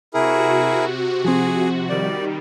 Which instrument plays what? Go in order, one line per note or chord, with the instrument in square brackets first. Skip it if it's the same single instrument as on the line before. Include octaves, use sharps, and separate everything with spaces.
[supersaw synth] C3 F#4 [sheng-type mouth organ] E4 G#4 A#4
[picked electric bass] F3 C4 [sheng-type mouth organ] G#4
[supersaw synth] D#3 G3 [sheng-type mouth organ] D5